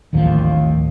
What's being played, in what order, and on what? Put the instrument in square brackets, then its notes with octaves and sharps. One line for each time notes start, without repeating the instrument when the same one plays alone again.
[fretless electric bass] D1 A1 D#2 F3